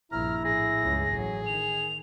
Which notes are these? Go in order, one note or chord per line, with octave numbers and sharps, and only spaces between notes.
A#1 G2 E4 A#5 F6
A2 G#4 A#6
C#2 G2
A1 F#3
D#3 F7